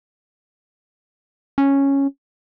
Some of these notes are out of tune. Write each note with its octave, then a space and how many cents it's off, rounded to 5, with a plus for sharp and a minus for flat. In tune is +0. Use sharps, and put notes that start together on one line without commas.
C#4 -5